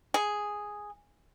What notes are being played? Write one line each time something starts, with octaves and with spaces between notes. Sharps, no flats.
G#4